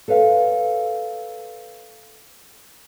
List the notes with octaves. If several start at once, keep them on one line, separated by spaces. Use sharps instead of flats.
A4 B4 C#5 F5